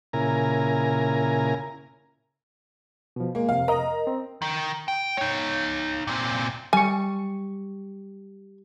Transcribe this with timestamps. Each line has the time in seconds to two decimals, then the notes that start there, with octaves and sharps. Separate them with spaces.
0.13 A#2 C#3 E4 A#4 G#5 A#5
3.16 B2 F3
3.35 G#3 A#3
3.49 F2 C3 F5
3.68 A#4 D#5 A#5
4.07 C4
4.42 D#3
4.88 G5
5.17 D#4 C#5
6.07 A#2 C4
6.73 G3 G#5 C#6